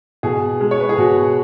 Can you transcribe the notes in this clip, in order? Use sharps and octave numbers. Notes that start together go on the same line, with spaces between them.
B2 G#4
G#3
C#5
B4
G#4
B2 F#4